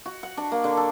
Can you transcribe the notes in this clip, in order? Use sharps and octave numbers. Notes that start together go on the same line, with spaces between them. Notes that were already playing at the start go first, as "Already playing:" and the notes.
F#4
F#5
D4
A#3
D3
A4